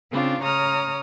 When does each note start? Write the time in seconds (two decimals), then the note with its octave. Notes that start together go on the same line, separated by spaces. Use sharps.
0.11 C#3 C4 D4 F4
0.42 C#3 C#5 A#5 D#6 F6